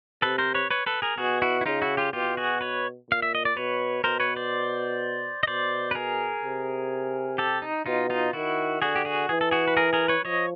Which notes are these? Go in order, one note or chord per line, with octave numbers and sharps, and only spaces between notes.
C3 A4 B4
A#4 C5
B4 C#5
B4 C#5
A4 B4
G#4 A#4
B2 F#4 G#4
E4 F#4
E4
C#3 D#4 F4
E4 F#4
F4 G4
B2 F4 G4
F#4 G#4
B4 C#5
A#2 F5
E5
D#5
D5
B2 B4 C#5
B2 A#4 C5
B4 C#5
C5 D5
D#5
B2 C5 D5
B4
G#4 A#4
C3
G4 A4
D#4
B2 D#4 F4
D#4 F4
D#3 E4 F#4
D3 F#4 G#4
G4
F#4 G#4
E3 G#4
A4
F#4 G#4
B4
G#4 A#4
G#4 A#4
B4 C#5
F3 C#5 D#5